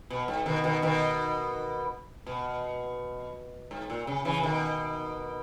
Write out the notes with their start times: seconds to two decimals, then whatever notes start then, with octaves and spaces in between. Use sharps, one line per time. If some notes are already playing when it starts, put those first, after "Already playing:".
0.10 B2
0.28 G#2
0.46 B2 D#3
0.64 B2 D#3
0.82 B2 D#3
2.27 B2
3.71 G#2
3.90 A#2
4.07 C#3
4.25 C#3 E3
4.43 B2 D#3